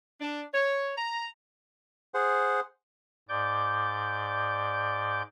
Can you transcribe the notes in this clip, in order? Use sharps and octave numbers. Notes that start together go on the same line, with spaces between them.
D4
C#5
A#5
G#4 C5 F#5
G#2 D5 D6 G6